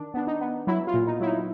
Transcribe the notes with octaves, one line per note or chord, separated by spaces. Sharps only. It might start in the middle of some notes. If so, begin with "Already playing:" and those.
Already playing: D#3 D4
B3 D4
D#4
B3
F#3 E4
F4
A#2
D#4
F#3 E4
D#4